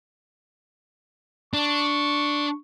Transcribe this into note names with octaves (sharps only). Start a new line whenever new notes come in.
D4 C#6